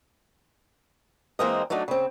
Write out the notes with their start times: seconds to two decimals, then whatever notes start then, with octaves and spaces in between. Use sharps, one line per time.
1.39 E3 G#3 A#3 C4 A#4 D#5
1.70 F#3 A3 D4 D#4
1.88 C#3 C4